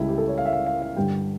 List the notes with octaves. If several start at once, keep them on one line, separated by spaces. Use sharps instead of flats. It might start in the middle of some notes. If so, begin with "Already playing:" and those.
Already playing: C#2 C#3 G3 E4
G4
A4
C#5
F5
E5
F5
F5
F5
G2 D3 G3 G5